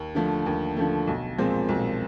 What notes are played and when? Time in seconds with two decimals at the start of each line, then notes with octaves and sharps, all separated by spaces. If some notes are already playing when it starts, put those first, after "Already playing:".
Already playing: D#2
0.15 D3 F3 A3
0.46 D#2
0.76 D3 F3 A3
1.07 B1
1.38 A#2 F3 G#3 C4
1.69 B1